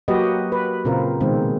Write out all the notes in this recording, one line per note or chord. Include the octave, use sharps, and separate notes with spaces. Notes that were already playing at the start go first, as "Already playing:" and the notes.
F#3 A#3 F#4 G4 B4 D#5
B4
A#2 C#3 C4 F4 A#4
B2 D#3 G#3 C4